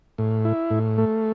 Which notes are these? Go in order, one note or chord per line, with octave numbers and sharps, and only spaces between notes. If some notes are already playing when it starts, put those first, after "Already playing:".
A2
E4
A2
A3